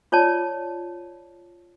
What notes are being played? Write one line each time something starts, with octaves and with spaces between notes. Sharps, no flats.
F4 C#5 D5 A5